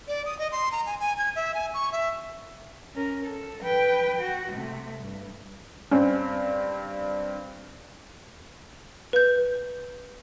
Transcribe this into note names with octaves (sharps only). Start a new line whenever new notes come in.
D5
D#6
D#5
C6
A#5
G#5
G#5
G#6
E5
G#5
C#6
E5
C#4 A#4
A4
B4 G5
F#4
C3 A3
G2
G2 C4 C#4
B4 G6